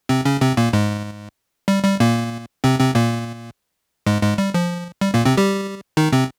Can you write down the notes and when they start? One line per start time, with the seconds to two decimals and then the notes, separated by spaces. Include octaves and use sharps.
0.09 C3 C4
0.25 C#3 C#4
0.41 C3 C4
0.57 A#2 A#3
0.73 G#2 G#3
1.68 G3
1.85 G3
2.00 A#2 A#3
2.64 C3 C4
2.79 C3 C4
2.95 A#2 A#3
4.06 G#2 G#3
4.22 G#2 G#3
4.38 G3
4.54 F3
5.01 G3
5.14 A#2 A#3
5.25 C3 C4
5.37 G3 G4
5.97 D#3 D#4
6.13 C3 C4